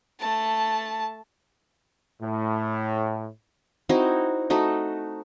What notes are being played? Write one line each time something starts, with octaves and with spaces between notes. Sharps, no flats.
A3 A5
A2
C4 D#4 E4 F#4
A3 D#4 F#4